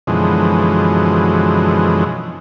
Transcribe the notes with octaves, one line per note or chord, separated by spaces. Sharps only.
F#2 B2 D3 E3 F3 G#3